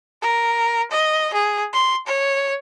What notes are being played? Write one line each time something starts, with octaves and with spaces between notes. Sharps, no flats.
A#4
D#5
G#4
C6
C#5